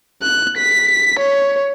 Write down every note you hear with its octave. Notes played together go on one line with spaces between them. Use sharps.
F#6
B6
C#5